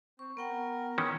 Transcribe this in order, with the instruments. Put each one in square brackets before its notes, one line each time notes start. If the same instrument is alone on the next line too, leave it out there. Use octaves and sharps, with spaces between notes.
[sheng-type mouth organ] C4 [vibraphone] C#6
[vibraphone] B3 F#5 G5 [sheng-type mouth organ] A#4
[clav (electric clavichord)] D#3 E3 C#4